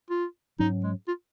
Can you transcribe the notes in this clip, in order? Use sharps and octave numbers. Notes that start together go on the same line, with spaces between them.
F4
G#2 F#3 C#4 D#4
G#3
F4